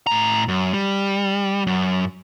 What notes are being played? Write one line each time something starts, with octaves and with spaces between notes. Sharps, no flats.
A2 A#5
F#2
G3
F#2